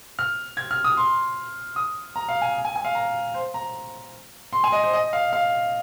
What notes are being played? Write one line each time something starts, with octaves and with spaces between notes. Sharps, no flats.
F6
G#6
F6
D#6
C6
D#6
A#5
F5
G#5
G#5
G#5
F5
A#5
C5
A#5
C6
G#5
D#5
C5
D#5
F5
F5